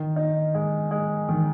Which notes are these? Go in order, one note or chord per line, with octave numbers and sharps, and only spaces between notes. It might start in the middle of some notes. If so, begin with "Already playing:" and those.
Already playing: D#3
D#4
G#3
G#3
D#3